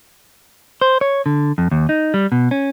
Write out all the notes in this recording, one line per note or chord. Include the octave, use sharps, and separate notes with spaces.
C5
C#5
D3
F2
D#2
D#4
G3
B2
C#4